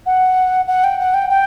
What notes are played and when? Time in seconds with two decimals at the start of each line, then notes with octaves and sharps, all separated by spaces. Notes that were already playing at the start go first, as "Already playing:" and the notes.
0.06 F#5
0.67 F#5
0.84 G5
0.99 F#5
1.14 G5
1.30 G5